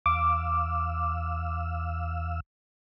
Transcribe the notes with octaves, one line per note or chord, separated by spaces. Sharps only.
E2 F5 D6 E6